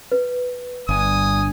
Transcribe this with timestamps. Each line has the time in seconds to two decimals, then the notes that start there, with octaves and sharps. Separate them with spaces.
0.12 B4
0.89 G1 G2 G#5 D#6